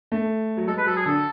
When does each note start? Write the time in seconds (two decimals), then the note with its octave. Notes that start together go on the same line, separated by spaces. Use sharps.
0.12 A3
0.57 F#3
0.67 G#3 A4
0.77 B4
0.87 F#3 A4
0.96 G#4
1.05 D3 A4